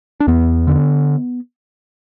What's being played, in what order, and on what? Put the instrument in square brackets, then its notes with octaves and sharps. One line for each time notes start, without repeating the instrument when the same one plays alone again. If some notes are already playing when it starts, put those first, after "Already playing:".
[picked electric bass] D4
E2 B3
D3